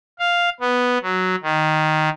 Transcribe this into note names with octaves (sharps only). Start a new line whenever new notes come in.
F5
B3
F#3
D#3